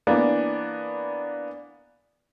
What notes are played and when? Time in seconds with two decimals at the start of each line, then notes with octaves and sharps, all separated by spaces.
0.07 E3 A#3 B3 D4